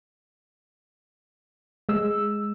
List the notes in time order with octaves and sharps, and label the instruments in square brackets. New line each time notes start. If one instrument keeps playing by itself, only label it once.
[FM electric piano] G#3 E6